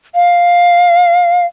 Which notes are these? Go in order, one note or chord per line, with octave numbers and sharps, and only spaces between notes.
F5